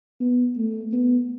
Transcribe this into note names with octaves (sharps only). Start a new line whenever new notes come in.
B3
A3
B3